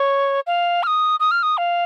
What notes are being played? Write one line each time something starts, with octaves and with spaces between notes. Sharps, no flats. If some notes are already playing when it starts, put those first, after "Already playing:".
Already playing: C#5
F5
F6
D#6
D#6
F6
D#6
F5